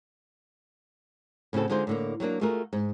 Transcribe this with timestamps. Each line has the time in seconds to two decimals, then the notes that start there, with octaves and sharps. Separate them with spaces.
1.53 A2 C#3 C4 F#4 A4
1.69 D3 G#3 D#4 F4 C5
1.87 A2 D3 A#3
2.20 F#3 G3 A#3 D4
2.41 A3 F4 F#4 G#4 A#4
2.73 G#2